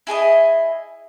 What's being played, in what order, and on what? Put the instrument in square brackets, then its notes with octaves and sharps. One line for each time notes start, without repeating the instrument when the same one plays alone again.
[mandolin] E4 G#4 A4 D#5